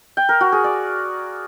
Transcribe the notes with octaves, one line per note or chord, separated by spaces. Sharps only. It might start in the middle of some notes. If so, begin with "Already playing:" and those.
G5
A#4
F#4
G#4
D5